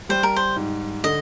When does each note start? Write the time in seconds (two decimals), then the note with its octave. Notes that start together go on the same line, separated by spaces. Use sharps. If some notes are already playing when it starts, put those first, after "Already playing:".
0.09 G3 C5
0.23 A#4
0.37 C5
0.56 G#2
1.04 D3 D#5